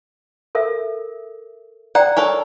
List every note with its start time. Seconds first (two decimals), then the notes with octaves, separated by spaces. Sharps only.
0.55 A4 A#4 E5
1.95 D5 F#5 G5 A#5
2.17 A4 A#4 C#5